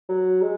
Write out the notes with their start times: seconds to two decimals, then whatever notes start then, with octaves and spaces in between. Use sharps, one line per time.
0.09 F#3
0.42 G#3